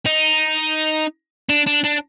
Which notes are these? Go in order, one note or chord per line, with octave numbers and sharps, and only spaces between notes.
D#4
D4
D4
D4